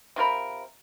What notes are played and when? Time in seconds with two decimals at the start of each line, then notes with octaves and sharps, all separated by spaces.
0.16 C3 F4 A#4 B5